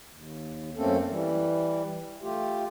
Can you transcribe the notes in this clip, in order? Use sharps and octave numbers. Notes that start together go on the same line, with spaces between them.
D#2
F#2 A3 A#3 C4 C#4 A4
E3 G3
A3 F4 G4